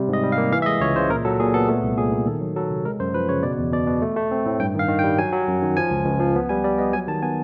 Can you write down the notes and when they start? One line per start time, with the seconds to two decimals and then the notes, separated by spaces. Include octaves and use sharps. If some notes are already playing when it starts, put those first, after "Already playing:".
Already playing: C3 G3
0.08 G#2
0.13 D#5
0.23 G3
0.32 F5
0.38 A#3
0.52 E3 F5
0.62 E5
0.66 G#3 D#5
0.81 C#2 C#5
0.96 C#3 C5
1.10 A#2 A#4
1.25 F#3 A4
1.40 A#2 G#4
1.54 B3 A4
1.68 A3
1.83 C2
1.97 A#2 G#4
2.12 A#2
2.26 D#3 A4
2.41 F#3
2.56 F#3 A4
2.70 C3
2.85 G#3 A#4
3.00 F#2 C5
3.14 F3 B4
3.29 C#3 C#5
3.43 B2 D5
3.58 E2
3.72 B2 D5
3.87 B2
4.02 A3
4.16 A3
4.31 C4
4.46 A2
4.60 G2 G5
4.75 D#3 F5
4.89 D#3
4.99 G5
5.04 G3
5.18 F#3 G#5
5.32 F#3
5.48 F#2
5.62 D#3
5.77 F3 G#5
5.91 C#2
6.05 C#2
6.20 F3
6.36 B3
6.49 G3 G#5
6.64 G3 D5
6.78 B3 D#5
6.93 F#3 G#5
7.08 D#3 A5
7.22 B3 G#5